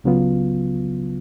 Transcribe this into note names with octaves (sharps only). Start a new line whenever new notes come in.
C#2 C#3 F#3 B3 F4